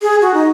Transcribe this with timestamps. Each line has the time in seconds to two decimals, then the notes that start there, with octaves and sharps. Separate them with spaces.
0.02 G#4
0.22 F#4
0.34 D#4